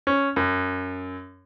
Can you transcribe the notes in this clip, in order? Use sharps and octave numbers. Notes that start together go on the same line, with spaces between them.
C#4
F#2